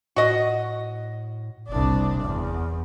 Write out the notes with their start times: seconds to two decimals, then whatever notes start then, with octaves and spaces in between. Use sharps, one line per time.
0.16 A2 F#4 D#5
1.68 F#1 C2 D4
2.22 E2